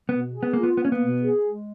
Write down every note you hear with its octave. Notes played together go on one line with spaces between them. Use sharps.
B2 B3
G#4
B3
A#3 F4
B3
A#3 B3
C#4
B3
B2
G#4
G#3